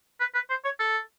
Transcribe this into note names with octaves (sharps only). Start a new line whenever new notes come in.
B4
B4
C5
C#5
A4